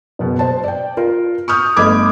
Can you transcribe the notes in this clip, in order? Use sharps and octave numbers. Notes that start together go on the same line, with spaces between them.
F#1 B2
C5 A5
D5 G5
F4 A#4
C#6 D#6 F6 G6
G1 A3 D#5 B5 D6 G#6